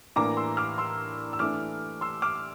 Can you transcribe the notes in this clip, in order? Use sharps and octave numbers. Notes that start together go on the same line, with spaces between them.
A2 E3 A#3 D4 A#5 D6
C6 E6
D6 F6
C6 E6
E6
E3 A3 D4 D6 F6
C6 E6
D6 F6